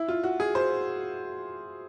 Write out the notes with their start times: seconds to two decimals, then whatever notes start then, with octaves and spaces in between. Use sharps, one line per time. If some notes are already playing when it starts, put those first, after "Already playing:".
Already playing: E4
0.08 F4
0.23 F#4
0.40 G#4
0.55 C5